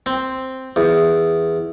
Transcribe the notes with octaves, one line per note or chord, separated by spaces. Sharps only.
C4
E2